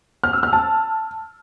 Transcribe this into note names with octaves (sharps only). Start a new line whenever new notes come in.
F6
E6
F6
A5